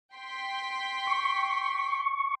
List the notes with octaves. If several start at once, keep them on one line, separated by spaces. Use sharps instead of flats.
G5 C6 B6
C#6